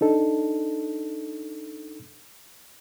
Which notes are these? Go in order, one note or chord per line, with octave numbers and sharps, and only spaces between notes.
D4 D#4 A4